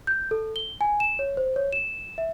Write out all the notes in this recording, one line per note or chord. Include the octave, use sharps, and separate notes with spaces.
G6
A4
G7
G#5
E7
C#5
C5
C#5
E7
E5